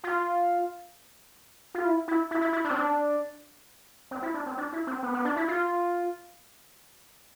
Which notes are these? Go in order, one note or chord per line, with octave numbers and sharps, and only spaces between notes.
F4
F4
E4
E4
E4
E4
E4
D4
C4
D4
C4
E4
D4
C4
D4
E4
C4
B3
B3
D4
E4
F4